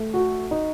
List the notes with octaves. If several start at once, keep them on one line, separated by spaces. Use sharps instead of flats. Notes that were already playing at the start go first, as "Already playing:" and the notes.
Already playing: A3
F#4
D#4